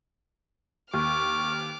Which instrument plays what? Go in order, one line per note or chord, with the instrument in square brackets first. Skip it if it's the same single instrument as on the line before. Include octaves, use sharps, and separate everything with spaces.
[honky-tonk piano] D#2 [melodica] A#4 [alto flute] C#6 [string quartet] D6 F6